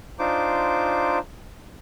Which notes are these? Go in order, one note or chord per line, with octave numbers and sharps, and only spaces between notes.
D4 D#4 F4 C5 D6